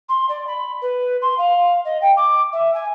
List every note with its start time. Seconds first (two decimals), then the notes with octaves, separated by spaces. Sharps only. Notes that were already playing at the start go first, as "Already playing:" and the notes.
0.09 C6
0.29 D5
0.47 B5
0.82 B4
1.22 C6
1.38 F5
1.85 D#5
2.01 G5
2.17 D6
2.53 E5
2.75 G#5